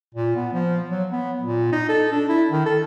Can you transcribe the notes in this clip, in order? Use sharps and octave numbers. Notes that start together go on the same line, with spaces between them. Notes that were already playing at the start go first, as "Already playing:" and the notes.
A#2
B3
F3
F#3
B3
A#2
D#4
A4
D4
E4
D#3
A4